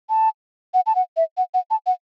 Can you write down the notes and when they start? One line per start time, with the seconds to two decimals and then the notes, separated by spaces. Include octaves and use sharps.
0.09 A5
0.74 F#5
0.86 A5
0.95 F#5
1.17 E5
1.37 F#5
1.54 F#5
1.71 A5
1.87 F#5